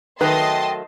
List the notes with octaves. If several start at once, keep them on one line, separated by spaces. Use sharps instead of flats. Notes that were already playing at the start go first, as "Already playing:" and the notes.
D#3 F#3 A3 B4 D#5 G5 A5 C6